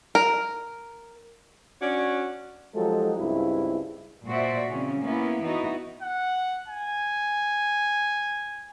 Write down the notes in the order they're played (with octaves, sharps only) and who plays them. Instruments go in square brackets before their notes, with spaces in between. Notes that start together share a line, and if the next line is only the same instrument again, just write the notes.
[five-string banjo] A#4
[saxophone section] C#4 D4 F#4 C#5 D5
[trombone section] F3 F#3 G#3 D#4 G4 A4
C#2 G2 C4 E4
[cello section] A#2 F#4 C5 D5 E5
C#3 E3 C4 C#4
A#3 B3 C#4 E4
E3 B3 D#4 E4 F#4
[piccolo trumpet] F#5
G#5